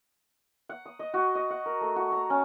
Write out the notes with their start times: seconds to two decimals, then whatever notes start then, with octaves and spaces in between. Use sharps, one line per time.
0.69 F#5
0.86 D#6
0.99 D#5
1.14 F#4
1.35 D#5
1.50 F#5
1.66 A#4
1.81 A3
1.96 F#4
2.12 A#5
2.30 C#4